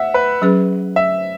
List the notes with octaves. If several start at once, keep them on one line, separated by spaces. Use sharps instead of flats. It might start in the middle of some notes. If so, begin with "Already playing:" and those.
Already playing: E5 F#5
B4
F#3 C#4 G#4 B4
E5